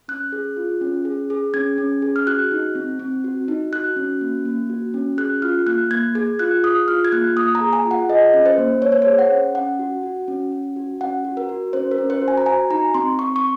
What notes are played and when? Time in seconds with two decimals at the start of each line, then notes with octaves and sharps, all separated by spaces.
0.08 C#4 F#6
0.32 G#4
0.57 F4
0.81 C#4
1.05 G#4
1.30 G#4
1.54 C#4 G#6
1.78 C#4
2.02 G#4
2.16 F6
2.27 F#4 F#6
2.51 D#4
2.75 C4
2.99 C4
3.24 F#4
3.48 D#4
3.72 F#4 F#6
3.96 C#4
4.21 A#3
4.45 A#3
4.70 F#4
4.94 C#4
5.18 G#4 F#6
5.42 F4 F6
5.67 A#3 F#6
5.91 A#3 G#6
6.15 G#4 G#6
6.39 F4 F#6
6.64 G#4 D#6
6.88 F4 F6
7.05 G#6
7.12 A#3 F#6
7.37 A#3 D#6
7.55 A#5
7.61 G#4
7.73 G#5
7.85 F4
7.91 F#5
8.09 G#4 D#5
8.34 C#4
8.46 C5
8.58 A#3
8.82 A#3 C#5
8.92 C5
9.02 G#4 C#5
9.19 F#5
9.31 C#4
9.55 C#4 F#5
9.79 F#4
10.03 F#4
10.28 C#4
10.52 C#4
10.76 F#4
11.01 C#4 F#5
11.25 F#4
11.37 A#4
11.49 F#4
11.73 C#4 C5
11.91 A#4
11.98 C#4
12.10 C5
12.22 F#4
12.28 G#5
12.37 A#5
12.46 F#4 G#5
12.70 D#4 A#5
12.94 C4 C6
13.19 C4 C#6
13.36 C#6